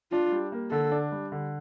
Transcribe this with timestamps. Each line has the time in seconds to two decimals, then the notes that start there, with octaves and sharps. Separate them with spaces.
0.12 D4 F4
0.32 G3
0.52 A#3
0.71 D3 A4
0.92 D4
1.12 G3
1.32 D3